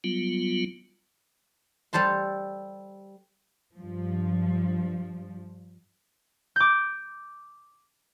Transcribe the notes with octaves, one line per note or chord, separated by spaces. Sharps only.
F#3 G3 B3 F4
G3 A4 C5 A5 C6
G2 F3
D6 G6